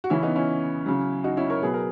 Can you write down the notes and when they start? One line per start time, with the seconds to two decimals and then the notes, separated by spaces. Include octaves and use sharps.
0.04 F#4
0.10 C#3 E3 C#4 E4
0.23 B3 D#4
0.36 C#4 E4
0.86 C#3 F#3
1.24 D#4 F#4
1.37 C#4 E4
1.50 A#4 C#5
1.62 B2 F#3 G#4 B4
1.74 A#4